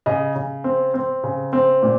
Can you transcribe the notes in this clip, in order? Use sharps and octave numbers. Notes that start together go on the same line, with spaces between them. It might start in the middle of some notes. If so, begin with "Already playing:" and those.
C#3 D#5
C#3
C4
C4
C#3
C4
A#2